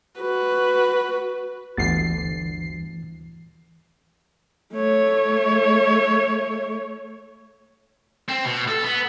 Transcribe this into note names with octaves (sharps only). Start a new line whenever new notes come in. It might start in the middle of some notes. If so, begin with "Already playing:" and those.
F#4 B4
G1 D2 E3 A6 C7
A3 C#5
C4
B2
A4
B3